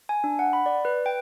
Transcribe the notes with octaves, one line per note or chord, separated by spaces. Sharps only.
G#5
D4
F#5
B5
D5
B4
G5